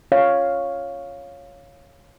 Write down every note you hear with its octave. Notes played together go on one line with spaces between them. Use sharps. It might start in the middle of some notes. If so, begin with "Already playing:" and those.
C#5 F5